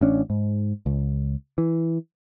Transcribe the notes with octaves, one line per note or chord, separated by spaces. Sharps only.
A1 C#4 D4
G#2
C#2
E3